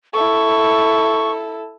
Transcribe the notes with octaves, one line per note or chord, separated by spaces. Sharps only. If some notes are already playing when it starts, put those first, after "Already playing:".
E4 A4 C#6